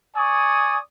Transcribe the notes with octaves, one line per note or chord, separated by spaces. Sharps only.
D5 G#5 C#6 D#6